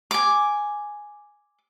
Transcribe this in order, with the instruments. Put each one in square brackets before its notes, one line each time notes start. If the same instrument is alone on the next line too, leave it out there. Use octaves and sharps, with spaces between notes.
[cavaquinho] G#5 D6